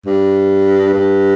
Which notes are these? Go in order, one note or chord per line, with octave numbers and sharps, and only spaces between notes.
G2
G2